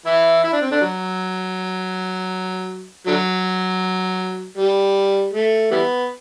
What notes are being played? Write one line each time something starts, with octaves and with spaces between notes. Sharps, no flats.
E3 E4
E4
D4
C4
D3 D4
F#3
D3 F#3
G3
A3
E3 G3 B3